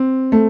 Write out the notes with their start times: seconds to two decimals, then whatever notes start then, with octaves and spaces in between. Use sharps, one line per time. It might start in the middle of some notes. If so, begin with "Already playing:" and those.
Already playing: C4
0.32 A3